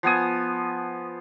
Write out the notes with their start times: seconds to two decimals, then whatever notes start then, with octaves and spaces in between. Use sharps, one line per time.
0.03 F3 B3 G#5 D#6